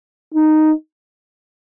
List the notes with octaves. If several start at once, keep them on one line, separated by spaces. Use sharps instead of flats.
D#4